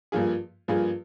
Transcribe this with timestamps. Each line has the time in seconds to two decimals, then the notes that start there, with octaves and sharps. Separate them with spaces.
0.12 G2 F3 A#3 F4 G#4
0.68 G2 F3 A#3 F4 G#4